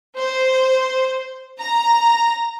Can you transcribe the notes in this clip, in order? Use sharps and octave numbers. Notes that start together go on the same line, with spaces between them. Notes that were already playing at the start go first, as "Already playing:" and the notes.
C5
A#5